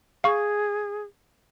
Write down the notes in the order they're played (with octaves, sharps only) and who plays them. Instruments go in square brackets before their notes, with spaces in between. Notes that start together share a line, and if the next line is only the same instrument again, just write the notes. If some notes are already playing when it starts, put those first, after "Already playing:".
[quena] G#4 [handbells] F5 C#6